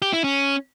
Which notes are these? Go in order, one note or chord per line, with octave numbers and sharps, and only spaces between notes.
G4
E4
C#4